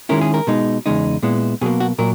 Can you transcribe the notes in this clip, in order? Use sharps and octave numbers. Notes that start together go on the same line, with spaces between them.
D#3 G#3 C#4 E4 A#4
G#4
A#4
B2 G#3 D#4
E2 C#3 G#3 D#4
A#2 G#3 B3 E4
B2 F#3 A#3 G#4
F#4
A#2 F#3 A#4